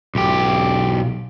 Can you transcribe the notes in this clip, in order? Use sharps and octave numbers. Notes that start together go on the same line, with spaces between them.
B1 G4